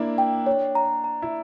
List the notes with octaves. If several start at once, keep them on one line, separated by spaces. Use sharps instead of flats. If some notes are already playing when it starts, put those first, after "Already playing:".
Already playing: A#3 D4 E4
G5
C#5
A#5
A#5
E4